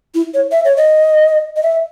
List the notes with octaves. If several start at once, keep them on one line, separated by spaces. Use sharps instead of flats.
E4
C#5
E5
C#5
D#5
D#5
E5